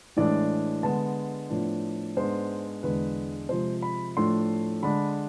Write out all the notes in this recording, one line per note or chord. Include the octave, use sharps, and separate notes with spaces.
A2 E3 G#3 D4 D5
D3 G#3 B3 A5
A2 F3 B3 D4
G#2 G#3 B3 D4 C5
E2 D3 G#3 D4 B4
C3 F3 G#3 C5
B5
A2 F3 A3 D4 C6
D3 G#3 D4 B5